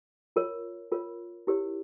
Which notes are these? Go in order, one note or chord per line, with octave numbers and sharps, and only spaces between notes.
F4 A#4 C#5
F4 A#4 C#5
E4 G4 A#4 C#5